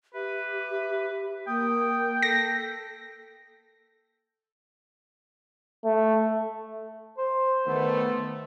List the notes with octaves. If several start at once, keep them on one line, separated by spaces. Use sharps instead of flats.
G4 B4 E5
A#3 G5 D#6
A4 A#6
A3
C5
D#3 A3 B3